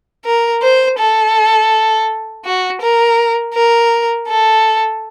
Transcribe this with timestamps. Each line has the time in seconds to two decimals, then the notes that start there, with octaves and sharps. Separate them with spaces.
0.25 A#4
0.62 C5
0.99 A4
2.45 F#4
2.81 A#4
3.54 A#4
4.28 A4